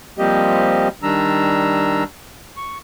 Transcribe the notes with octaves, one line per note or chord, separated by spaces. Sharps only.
F3 G3 A#3 C4 G4 D#5
D#3 G3 D4 A#5 E6
C#6